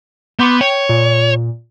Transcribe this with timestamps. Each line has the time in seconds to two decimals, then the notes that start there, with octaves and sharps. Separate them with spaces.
0.39 B3 C6 D6 G6
0.61 C#5 G5
0.89 A#2